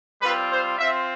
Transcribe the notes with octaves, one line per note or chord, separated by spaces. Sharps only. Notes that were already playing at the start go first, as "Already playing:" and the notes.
G3 C4 F4 B4
C5
C4 F4 E5